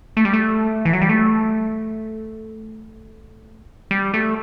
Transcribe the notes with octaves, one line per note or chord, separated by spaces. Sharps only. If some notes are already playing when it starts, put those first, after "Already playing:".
A3
G3
A3
E3
F#3
G3
A3
G3
A3